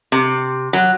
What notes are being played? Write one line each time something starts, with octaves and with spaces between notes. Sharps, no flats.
C3
F#3